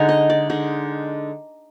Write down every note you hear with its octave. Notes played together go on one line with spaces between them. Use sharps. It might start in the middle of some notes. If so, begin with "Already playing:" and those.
Already playing: D3 G#3 D#4 F#5 G#5 A#5
D#5
D5
D3 G#3 D#4